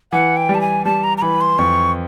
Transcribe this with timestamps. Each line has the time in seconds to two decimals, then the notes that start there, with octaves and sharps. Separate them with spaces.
0.12 E3 F#5
0.37 G5
0.49 G3
0.55 A5
0.61 G#5
0.85 G3 A5
1.04 A#5
1.17 A#5
1.22 E3 B5
1.41 C6
1.58 F2 C#6